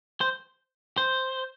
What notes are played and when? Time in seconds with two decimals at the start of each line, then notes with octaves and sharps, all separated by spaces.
0.21 C5
0.98 C5